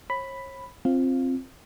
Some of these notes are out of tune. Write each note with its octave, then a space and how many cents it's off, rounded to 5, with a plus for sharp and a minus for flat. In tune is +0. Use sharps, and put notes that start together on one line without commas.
C#5 -40 B5 +5
C4 +10 F4 +0 F5 +5